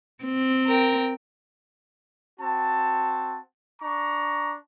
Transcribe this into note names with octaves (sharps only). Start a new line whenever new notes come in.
C4
A#4 G5
C4 F#4 A5
D4 A#5 C#6